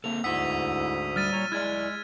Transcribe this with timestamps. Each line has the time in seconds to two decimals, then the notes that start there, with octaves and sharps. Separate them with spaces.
0.04 A#3 C4 A4 F7
0.24 D2 G#2 E4 F#5 D#6 E6 B6
1.16 G3 F6 A6 D#7
1.32 A#2 C#5 A#5
1.52 G#3 E4 D5 F6 G#6